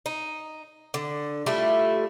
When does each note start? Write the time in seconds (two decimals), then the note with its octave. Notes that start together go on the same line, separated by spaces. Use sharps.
0.06 D#4
0.94 D3
1.46 G3 A3 E4 F4